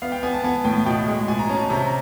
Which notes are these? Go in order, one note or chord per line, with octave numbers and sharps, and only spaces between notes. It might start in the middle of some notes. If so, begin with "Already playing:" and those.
B3 F5
G5
B3 G#5
A5
B3 G#5
A2 G5
B2 G5
G#3
B2 G#5
A#5
C#4 A5
A#5
C3 A#5